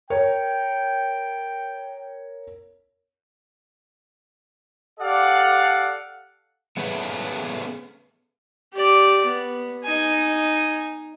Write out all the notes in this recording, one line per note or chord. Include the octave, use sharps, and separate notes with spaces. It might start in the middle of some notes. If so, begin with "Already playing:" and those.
A#4 C#5 G5
G4 A4 D5 F5 F#5
A3 B3 C#4 G#4 B4
G4 D5
B3
D#4 G#5